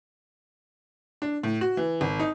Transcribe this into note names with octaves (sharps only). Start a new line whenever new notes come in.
D4
A2
F#4
E3
G#1
D#4